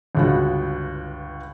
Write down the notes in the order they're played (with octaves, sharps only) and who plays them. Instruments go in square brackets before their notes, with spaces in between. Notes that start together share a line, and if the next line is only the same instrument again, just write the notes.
[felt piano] G1 C#2 F#4